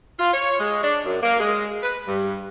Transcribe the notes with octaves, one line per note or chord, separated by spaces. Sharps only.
F4
C#5
G#3
D4
F#2
A#3
G#3
B4
G2